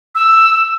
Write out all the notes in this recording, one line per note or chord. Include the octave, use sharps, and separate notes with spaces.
E6